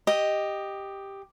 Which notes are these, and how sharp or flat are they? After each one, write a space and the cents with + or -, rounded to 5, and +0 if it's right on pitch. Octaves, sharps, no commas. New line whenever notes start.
G4 +5 D#5 +0